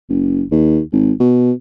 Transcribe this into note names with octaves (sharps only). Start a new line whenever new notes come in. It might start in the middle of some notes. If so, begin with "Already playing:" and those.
F#1
D#2
G#1
B2